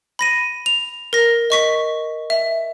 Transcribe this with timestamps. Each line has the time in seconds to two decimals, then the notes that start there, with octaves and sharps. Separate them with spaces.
0.19 B5 A#6 D#7
0.66 F7
1.13 A#4 A#6
1.50 D#5 C#6 B6
2.30 E5